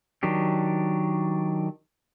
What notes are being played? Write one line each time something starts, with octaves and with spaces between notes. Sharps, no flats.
D#3 F#3 D4 G4